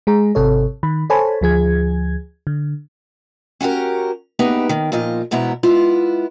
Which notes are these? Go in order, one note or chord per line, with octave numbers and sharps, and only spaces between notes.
G#3 G#4 A#5
G#1 C3 A4 C#5
D#3 B5
A4 C5 C#5 G#5 A5 B5
D2 F3 G#4 G#6
D3
C#4 F#4 G4 A#4
B3 D#4 E4 G4 G#4 B4
D#2 D#3
A#2 F3 F4 D#5
E2 G#2 B2 B3 E4 A#5
G#3 B3 E4 F4